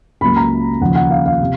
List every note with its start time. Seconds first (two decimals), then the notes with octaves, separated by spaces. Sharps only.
0.21 C#2 C#3 F#3 A#3 B5
0.36 A#5
0.81 D#2 C#3 F3 A#3 F#5
0.96 F#5
1.11 F5
1.26 F5
1.40 C3